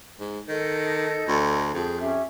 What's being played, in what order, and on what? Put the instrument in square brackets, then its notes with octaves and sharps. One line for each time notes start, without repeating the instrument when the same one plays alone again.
[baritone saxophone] G#2
[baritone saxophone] D#3 [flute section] A4 D#5 G6
[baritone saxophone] D2
[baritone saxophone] F2 [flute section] G#4 G6
[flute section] C#4 G4 E5